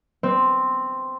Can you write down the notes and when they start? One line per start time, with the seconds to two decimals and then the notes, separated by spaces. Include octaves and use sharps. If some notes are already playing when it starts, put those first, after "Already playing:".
0.23 C4